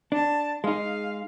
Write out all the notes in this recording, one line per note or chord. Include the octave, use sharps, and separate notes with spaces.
D4 A5
G#3 D#4 F5